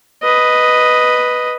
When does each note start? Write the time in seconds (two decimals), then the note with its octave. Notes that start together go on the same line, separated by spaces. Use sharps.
0.23 B4 D#5